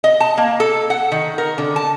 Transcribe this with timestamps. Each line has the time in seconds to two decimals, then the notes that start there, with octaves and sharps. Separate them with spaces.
0.04 D#5
0.20 A5
0.38 A#3
0.60 A4
0.90 F#5
1.12 D#3
1.38 A#4
1.58 D3
1.76 A5